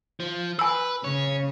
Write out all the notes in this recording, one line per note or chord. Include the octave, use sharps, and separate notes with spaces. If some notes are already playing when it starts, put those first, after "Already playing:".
F3
B4 G#5 E6
C#3 C#4 C#5